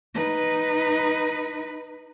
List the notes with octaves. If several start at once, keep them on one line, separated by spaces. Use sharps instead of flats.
D#4 B4